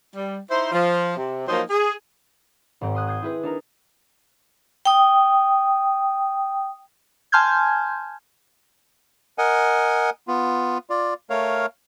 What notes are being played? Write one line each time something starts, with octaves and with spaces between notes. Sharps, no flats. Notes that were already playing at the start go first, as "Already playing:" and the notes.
G3
D#4 E4 C5
F3
C3
F3 F#3 A#3 D#4 C5
G#4
G#1 G#2 C4
C6 D#6 F#6 G#6
D#6 G6 G#6 C7
E4 G#4 B4
D4 D#4 A#4
G5 D#6
G#5 A5 C6 F6 G6 G#6
A#4 D#5 F#5 G#5
B3 F4
F4 D5
A3 A#4 C#5 F5